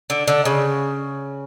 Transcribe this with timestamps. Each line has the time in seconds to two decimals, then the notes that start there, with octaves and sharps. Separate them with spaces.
0.10 D3
0.28 D3
0.45 C#3